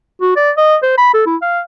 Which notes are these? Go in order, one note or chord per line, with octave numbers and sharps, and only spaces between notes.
F#4
D5
D#5
C5
B5
A4
E4
F5